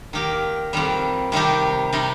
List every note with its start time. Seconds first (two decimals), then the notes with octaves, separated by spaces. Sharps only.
0.13 D#3 A#3 G4 A#4
0.73 F2 D#3 G3
1.32 C3 D#3 G3 D#4 G4
1.93 C3 G3 D#4